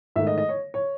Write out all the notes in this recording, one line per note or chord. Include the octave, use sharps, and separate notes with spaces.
G#2 D#3 A3 E5
D#5
D#5
C#5
C#5